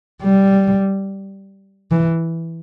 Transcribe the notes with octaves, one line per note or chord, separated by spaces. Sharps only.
G3
E3